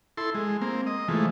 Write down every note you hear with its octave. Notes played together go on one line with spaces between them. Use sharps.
E4 A4 C6
G#3
A#3 C4
D#5
E3 F3 G#3 A3